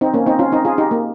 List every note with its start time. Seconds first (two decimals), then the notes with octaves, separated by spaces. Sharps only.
0.01 C4 D#4
0.14 A#3 C#4
0.26 C4 D#4
0.39 C#4 F4
0.52 C4 D#4
0.65 F4 G#4
0.78 D#4 G4
0.91 A#3